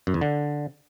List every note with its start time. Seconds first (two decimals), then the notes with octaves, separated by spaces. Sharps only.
0.07 F#2
0.14 E2
0.21 D3